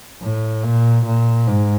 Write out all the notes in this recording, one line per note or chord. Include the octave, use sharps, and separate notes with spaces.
A2
A#2
A#2
G#2